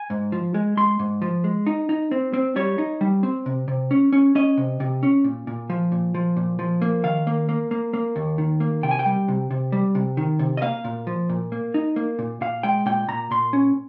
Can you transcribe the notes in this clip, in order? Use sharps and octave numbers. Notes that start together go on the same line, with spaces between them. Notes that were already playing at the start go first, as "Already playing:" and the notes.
Already playing: G#5
G#2
F3
G#3
G#3 C6
G#2
F3
G#3
D#4
D#4
C4
C4
G3 C#5
D#4
G3
C4
C3
C3
C#4
C#4
C#4 D#5
C3
C3
C#4
A#2
A#2
F3
A#2
F3
A#2
F3
A#3
D#3 F5
A#3
A#3
A#3
A#3
D#2
D#3
A#3
C3 G5
G#5
G5
G3
C3
C3
G3
C3
D#3
C3
D#5
A#3 F5
A#2
F3
A#2
A#3
D#4
A#3
A#2
A#2 F5
G#3 G5
A#2 G5
A#2 A#5
A#2 C6
C#4